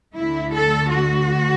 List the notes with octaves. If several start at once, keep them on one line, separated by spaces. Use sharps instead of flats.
D2 D3 A3 E4
A4
F#4